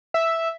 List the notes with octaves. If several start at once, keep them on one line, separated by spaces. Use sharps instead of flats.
E5